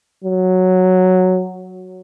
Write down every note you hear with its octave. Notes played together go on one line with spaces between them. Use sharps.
F#3